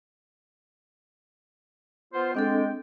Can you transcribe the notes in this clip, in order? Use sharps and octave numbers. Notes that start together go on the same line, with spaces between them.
B3 F4 C5
G#3 C4 D4 A4 G5